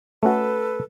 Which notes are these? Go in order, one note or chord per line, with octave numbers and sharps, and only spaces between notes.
A3 C#4 F#4 A4 B4